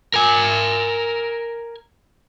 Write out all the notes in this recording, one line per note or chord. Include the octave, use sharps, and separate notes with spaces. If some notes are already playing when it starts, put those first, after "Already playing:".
A#4 G#5